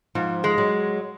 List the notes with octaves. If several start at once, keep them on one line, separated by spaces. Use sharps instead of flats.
G#2 F3
G#3
F#3